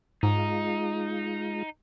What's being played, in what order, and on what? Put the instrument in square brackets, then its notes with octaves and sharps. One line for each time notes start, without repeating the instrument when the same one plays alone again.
[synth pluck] G#2 [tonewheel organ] G#3 F4 [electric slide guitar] D#4